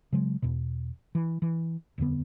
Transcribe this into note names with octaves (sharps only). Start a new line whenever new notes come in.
C#3 F#3 G#3
E2 B2
E3
E3
D#1 F2 D3 B3